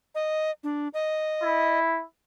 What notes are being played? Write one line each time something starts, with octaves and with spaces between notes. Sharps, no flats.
D#5
D4
D#5
E4